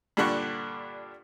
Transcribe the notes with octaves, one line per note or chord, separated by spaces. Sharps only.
G2 A#2 D3 D4 F#5 C#6